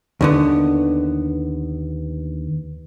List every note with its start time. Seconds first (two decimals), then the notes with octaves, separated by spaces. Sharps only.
0.21 D#2 D3 B3